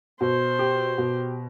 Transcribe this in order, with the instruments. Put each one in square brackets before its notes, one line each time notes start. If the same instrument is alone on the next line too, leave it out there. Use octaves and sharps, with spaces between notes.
[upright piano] B2 [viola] C5
[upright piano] G4
B2